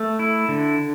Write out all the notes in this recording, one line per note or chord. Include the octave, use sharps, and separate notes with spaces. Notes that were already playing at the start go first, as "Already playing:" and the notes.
Already playing: A3
E4
D3